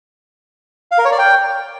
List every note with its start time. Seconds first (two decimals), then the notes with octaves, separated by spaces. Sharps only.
0.92 F5
0.98 A#4
1.05 C#5
1.12 D5
1.19 G5